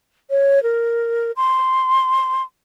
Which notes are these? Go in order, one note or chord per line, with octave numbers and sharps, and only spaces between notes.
C#5
A#4
C6